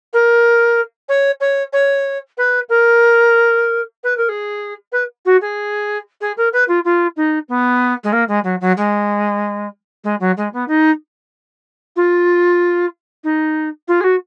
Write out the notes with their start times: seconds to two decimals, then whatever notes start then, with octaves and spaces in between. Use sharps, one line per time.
0.13 A#4
1.09 C#5
1.40 C#5
1.73 C#5
2.37 B4
2.69 A#4
4.04 B4
4.17 A#4
4.29 G#4
4.92 B4
5.25 F#4
5.41 G#4
6.21 G#4
6.37 A#4
6.53 B4
6.68 F4
6.85 F4
7.16 D#4
7.49 B3
8.04 G#3
8.12 A#3
8.28 G#3
8.44 F#3
8.61 F#3
8.77 G#3
10.04 G#3
10.20 F#3
10.37 G#3
10.53 B3
10.68 D#4
11.96 F4
13.24 D#4
13.88 F4
14.00 G#4
14.04 F#4